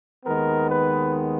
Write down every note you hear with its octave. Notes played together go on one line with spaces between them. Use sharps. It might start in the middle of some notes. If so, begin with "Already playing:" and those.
D#2 D#3 G#3 B3 A#4
B4